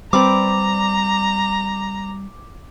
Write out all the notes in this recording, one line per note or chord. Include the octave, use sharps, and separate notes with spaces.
G3 C4 B4 D5 A#5 D6